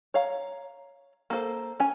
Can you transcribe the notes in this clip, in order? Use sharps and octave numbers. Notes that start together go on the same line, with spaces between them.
C#5 F5 A#5
A#3 A4 B4 C5
C#4 G#5